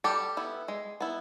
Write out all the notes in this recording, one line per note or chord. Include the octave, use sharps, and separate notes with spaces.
G3 G4 A4
B3 E4
G#3
B3 E4